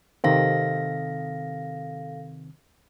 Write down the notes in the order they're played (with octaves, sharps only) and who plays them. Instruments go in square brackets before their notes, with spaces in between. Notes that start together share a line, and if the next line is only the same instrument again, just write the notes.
[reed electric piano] C3 D#3 C4 [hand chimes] A4 F5 A#6